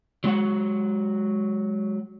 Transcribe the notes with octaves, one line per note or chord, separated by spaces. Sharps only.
F#3 G#3 F#4 F#5